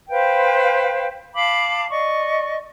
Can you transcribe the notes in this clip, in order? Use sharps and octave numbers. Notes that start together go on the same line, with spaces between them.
B4 C5 F5 G5
F5 A5 B5 D6
D5 D#5 C#6